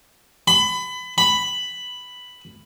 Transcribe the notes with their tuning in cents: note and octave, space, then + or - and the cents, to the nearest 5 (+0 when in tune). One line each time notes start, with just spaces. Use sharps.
B5 +25
B5 +5